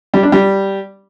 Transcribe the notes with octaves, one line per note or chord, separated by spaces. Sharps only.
G3
D4
G3